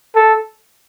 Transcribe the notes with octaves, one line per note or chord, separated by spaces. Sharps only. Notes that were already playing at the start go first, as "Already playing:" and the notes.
A4